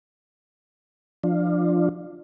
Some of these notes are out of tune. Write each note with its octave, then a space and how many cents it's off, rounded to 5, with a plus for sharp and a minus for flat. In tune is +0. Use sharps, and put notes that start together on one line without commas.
F3 +0 D4 +20 F4 +5